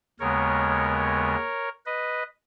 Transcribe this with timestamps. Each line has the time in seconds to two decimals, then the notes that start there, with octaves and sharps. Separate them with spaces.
0.20 D#2 C#3 G#3 B3 A#4 C#5
1.86 B4 D#5